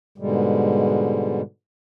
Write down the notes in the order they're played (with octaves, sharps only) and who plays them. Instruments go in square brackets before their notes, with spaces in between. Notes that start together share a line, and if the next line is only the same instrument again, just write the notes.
[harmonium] G#2 B2 D3 G3 G#3